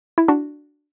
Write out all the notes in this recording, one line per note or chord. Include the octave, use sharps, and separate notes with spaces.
E4
D4 F#4